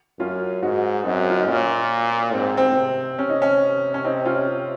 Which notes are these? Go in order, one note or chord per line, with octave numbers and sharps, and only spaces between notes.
F#2 C#4 F4
G#2 D#4 F#4
F#2 C4 D#4
F4
D#4
A#2 C#4
G#2 C4
C4
C3
C3 C#4
D#4
C#4
C#4
C4 D#4
C#4 F4